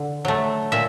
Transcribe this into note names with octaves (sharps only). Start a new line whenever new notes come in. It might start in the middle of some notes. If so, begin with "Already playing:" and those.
Already playing: D3
F#3 A3
A#2 E5